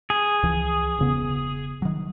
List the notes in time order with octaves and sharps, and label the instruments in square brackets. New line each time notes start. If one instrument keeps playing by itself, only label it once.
[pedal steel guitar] G#4
[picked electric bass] C#2 E3 F3
E1 C#3 B3
D#3 F#3